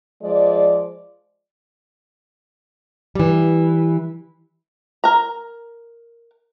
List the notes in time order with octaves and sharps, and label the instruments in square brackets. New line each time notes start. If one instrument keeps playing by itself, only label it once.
[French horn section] F3 G#3 D5
[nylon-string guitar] E3 G3
[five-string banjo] A#4 A#5